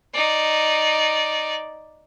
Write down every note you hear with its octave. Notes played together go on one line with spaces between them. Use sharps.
D#4 D5